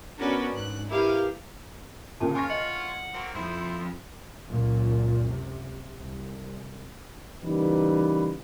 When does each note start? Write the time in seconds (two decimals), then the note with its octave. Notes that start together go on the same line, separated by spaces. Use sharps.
0.17 B3 C#4 D4 F#4 A#4 B4
0.52 G#2 F#6
0.88 E4 G4 A#4 B4 F5
2.20 A#2 C#3 A#3 A#4 G5 A5
2.35 F4 C#5 G#5 C6 C#6 F6 A#6
2.50 D#5 F#5
3.13 F#3 A#3 C4
3.34 F2 G#2 E4 C5
4.49 C#2 F#2 A#2
5.28 C3
5.94 C2
7.43 C#3 E3 G3 A#3 D#4 B4